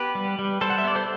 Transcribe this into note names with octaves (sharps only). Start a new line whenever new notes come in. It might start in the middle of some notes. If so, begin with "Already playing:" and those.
Already playing: B3 G4 B4
G3
G3
G3 A4 C5
F#5
E5
B3 D5
A4 C5